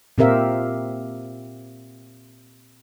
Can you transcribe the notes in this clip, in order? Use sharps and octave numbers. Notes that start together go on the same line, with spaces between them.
A#2 C4 G4 A#4 E5 F5